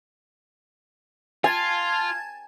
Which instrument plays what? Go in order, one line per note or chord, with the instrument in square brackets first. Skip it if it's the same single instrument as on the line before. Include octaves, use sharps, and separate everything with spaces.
[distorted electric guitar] F4 [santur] G#5 [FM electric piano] A5 G#6 A6